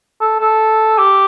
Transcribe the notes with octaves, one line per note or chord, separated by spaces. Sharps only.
A4
A4
G4